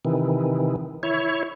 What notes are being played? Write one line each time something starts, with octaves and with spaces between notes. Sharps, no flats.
C3 D#3 E3
E4 C#5